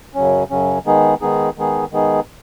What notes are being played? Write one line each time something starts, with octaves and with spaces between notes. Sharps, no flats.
F#2 C#3 F#3 C#4
F#2 C#3 F#3 C#4
D#3 G#3 B3 D#4 G#4
D#3 G#3 B3 D#4 G#4
D#3 G#3 B3 D#4 G#4
D#3 G#3 B3 D#4 G#4